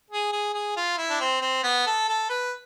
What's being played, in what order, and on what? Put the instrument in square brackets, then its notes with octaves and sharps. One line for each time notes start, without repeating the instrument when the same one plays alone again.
[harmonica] G#4
G#4
G#4
F4
E4
D4
C4
C4
B3
A4
A4
B4